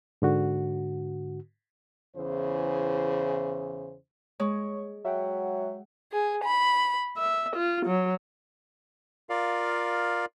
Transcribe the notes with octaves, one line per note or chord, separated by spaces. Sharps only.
G#2 D3 F#4
E2 C#3 E3 C5
G#3 C#5 C#6
F#3 E5 F#5 G5
G#4
B5
E5
F4
F#3
F4 A#4 D5 F5